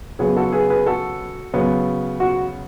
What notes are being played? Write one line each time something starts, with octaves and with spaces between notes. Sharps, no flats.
C#3 F#3 B3 G#4
F#4 A4
G#4 B4
G#4 B4
F#4 A4
C#3 F#3 B3
F#4